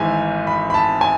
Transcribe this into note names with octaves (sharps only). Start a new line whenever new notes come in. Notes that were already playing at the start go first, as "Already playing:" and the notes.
Already playing: G#1 G#2 E3 E5 G#5
B5
B5
A5
G#5